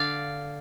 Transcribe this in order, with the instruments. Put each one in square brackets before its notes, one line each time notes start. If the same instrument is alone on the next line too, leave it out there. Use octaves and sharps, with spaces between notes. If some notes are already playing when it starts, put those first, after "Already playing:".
Already playing: [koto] D3 D5 F5